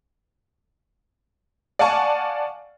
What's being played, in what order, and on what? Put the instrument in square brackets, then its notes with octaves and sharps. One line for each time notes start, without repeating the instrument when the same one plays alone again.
[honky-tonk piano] D5 F5 F#5 G#5 A5 C#6